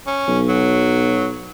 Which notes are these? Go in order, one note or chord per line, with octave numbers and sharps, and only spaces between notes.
C#4
B1
F#3